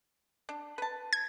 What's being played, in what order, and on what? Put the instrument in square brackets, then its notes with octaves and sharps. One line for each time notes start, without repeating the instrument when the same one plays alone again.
[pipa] D4
B4 A5
[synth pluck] G#6